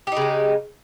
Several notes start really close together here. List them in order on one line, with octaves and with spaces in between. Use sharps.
G4 D#4 C#3 G#3